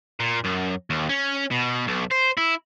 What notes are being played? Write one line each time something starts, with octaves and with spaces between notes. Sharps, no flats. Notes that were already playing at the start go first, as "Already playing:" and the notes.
A#2
F#2
D#2
C#4
B2
B1
C5
E4